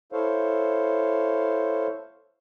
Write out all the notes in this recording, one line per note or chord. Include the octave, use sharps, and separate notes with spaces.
E4 A4 C5 C#5 F5